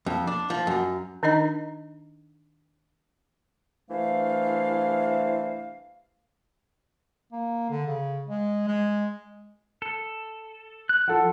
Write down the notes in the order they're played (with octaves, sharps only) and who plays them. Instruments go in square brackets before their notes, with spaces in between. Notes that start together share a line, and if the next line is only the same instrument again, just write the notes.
[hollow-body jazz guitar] F2
D4
F3
F#2
[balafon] D#3 D4 D#4 D#5 A#5
[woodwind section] C2 E3 A3 D4 C5 F5
[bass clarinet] A#3
D3
C#3
G#3
G#3
[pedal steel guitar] A4
F#6
[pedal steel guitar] F3 [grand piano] F4 A4 F#5